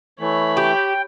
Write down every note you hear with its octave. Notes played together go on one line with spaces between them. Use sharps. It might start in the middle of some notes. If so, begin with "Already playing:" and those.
E3 A3 C#5 B5
G4 G5